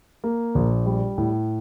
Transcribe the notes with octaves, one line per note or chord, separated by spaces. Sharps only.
A#3
A#1
G3
A2